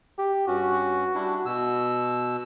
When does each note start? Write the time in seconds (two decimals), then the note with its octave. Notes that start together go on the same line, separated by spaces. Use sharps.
0.18 G4
0.47 G2 C#4 F#4
1.14 G3 D4 E4
1.46 B2 E6